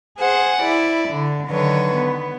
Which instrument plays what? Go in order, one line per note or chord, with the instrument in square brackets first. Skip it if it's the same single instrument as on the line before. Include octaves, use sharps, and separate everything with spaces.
[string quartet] G#4 C5 F#5
E4 D5
D3
D3 D#3 F#3 B4 C#5
B3